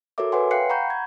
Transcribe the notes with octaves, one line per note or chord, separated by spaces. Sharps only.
F#4 A4 A#4 C#5 E5 D6
B4 C#5 E5 F#5 G#5 C6
F5 G5 F#6 C7 C#7
F#5 A#5 B5 C#6 G6
G#6